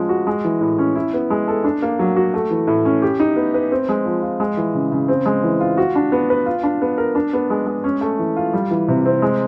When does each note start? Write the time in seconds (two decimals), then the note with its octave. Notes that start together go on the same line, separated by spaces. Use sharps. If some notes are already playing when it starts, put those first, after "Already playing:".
Already playing: F3 G#3 C#4
0.09 F#4
0.27 G#3
0.45 E3
0.61 A2
0.78 C#4
0.95 E4
1.14 B3
1.30 G#3
1.48 A4
1.64 D4
1.82 A#3
1.99 F#3
2.16 F#4
2.34 A3
2.51 E3
2.67 A2
2.85 C#4
3.02 G4
3.20 D#4
3.36 B3
3.54 B4
3.72 C4
3.89 G#3
4.05 F3
4.22 F4
4.40 G#3
4.57 E3
4.75 C#3
4.92 C#3
5.08 C4
5.26 G#3
5.43 E3
5.60 F4
5.77 F#4
5.95 D4
6.12 B3
6.30 B4
6.46 F4
6.63 D4
6.82 B3
6.98 A#4
7.15 D4
7.33 B3
7.50 G#3
7.67 G#3
7.84 C#4
8.01 A3
8.19 E3
8.36 F4
8.53 G3
8.71 E3
8.88 C3
9.06 C4
9.22 G#3